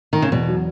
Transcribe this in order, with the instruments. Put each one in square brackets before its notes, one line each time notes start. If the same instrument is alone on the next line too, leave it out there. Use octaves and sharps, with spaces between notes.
[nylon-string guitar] D#3
C#3
[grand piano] E2 [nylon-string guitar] B2
[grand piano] F#3